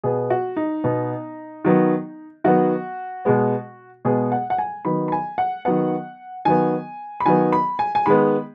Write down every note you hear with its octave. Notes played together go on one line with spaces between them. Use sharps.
B2 B3 G#4
F#4
D#4
B2 B3
D#3 F#3 B3
D#3 F#3 B3 F#4
B2 G#3 B3
B2 G#3 B3 G#4
F#5
F#5
G#5
D#3 F#3 B3 B5
B5
G#5
F#5
D#3 F#3 B3 F#5
D#3 F#3 B3 G#5
B5
D#3 F#3 B3 G#5
B5
G#5
G#5
D#3 G#3 B3 B5